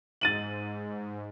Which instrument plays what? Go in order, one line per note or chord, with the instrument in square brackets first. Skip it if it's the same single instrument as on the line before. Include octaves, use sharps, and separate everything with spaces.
[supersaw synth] G#2 [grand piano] A6 D#7 F#7